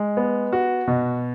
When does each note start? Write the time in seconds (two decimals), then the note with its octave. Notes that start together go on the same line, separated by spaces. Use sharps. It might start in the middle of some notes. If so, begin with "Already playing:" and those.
Already playing: G#3
0.17 B3
0.52 F#4
0.88 B2